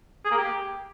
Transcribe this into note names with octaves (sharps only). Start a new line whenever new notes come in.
G#4
A#3
G4